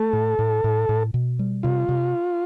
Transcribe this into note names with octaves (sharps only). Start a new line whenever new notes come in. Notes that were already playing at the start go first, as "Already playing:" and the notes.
Already playing: A3 A4
A2
A2
A2
A2
B2
G3
C3 F4
C3